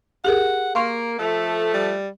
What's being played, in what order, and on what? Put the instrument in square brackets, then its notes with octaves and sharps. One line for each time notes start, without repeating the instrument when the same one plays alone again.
[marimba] G4 G#4 A#4 [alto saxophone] F#5
[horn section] A#3 [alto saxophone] A#4 [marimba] F5 C6 C#6
[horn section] F3 A3 [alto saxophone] A4
[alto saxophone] G3